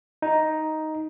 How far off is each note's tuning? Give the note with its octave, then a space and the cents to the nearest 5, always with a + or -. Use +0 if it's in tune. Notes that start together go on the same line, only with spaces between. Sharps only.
D#4 +5